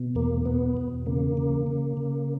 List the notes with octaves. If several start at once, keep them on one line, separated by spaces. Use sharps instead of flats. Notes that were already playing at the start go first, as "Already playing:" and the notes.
Already playing: B2
E2 A#3
B2 B3
E2
C#3 A#3
C#3
C#3
C#3